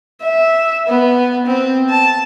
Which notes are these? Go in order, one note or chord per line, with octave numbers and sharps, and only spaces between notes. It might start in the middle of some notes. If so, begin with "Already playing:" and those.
E5
B3
C4
A5